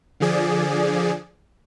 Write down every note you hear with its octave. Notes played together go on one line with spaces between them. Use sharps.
D3 F3 G#4 D5